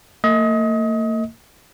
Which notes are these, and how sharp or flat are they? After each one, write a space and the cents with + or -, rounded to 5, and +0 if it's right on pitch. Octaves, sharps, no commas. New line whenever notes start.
A#3 -45 D#5 +30